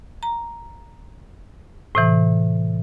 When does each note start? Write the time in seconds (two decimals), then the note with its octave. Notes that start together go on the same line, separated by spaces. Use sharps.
0.23 A#5
1.95 A2 C3 E3